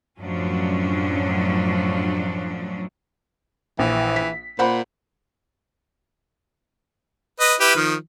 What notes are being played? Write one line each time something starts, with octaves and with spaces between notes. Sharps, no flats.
F#2 A2 F3 F#3 C#4 D4
A#1 E3
B6
A#2 C5 F#5 B5
B4 D#5
E4 G4 B4
D#3 F3